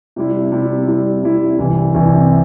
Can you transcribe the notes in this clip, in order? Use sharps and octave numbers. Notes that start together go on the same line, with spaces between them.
C3 G3 E4
C3 G3 E4
C3 G3 E4
C3 G3 E4
C2 C3 E3
C2 C3 E3